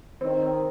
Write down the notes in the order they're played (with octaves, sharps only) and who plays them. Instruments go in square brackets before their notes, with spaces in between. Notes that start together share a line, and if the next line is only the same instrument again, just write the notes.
[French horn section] D#3 [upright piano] C4
[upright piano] C4